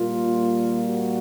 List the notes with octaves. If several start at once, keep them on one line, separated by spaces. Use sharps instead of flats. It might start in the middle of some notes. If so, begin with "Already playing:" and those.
Already playing: A#2 G3 A#3 F4
F#4